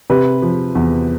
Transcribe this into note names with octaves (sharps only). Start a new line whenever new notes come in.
C3 B4
F3
E2